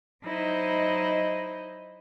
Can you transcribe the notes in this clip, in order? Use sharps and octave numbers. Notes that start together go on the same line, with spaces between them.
F#3 D#4 E4 C5 D#5